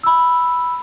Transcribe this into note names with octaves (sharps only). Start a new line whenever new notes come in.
B5 E6